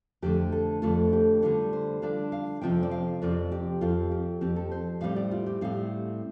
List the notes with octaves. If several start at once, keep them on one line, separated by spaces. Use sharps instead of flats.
F2 D3 A3 G4
A4
F2 D3 A3 F4
G4
D3 G3 D4 F4 A4
C5
D3 G3 D4 F4 F5
F5
F2 C3 F3 C4 F4 G5
D5
F5
F2 C3 F3 C4 F4 D5
G4
F2 F3 C4 F4
G4
F2 F3 C4 G4
A4
C5
A2 G3 C4 F5
D5
F4
G4
A2 G3 C4 F5